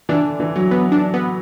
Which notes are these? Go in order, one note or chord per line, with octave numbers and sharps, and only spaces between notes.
E3 D4
D3
E3
F#3
B3
D4
B3